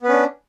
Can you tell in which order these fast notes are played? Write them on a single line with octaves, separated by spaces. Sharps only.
B3 B4 C#4 D4